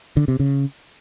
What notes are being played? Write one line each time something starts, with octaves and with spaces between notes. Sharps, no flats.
D3
C3
C#3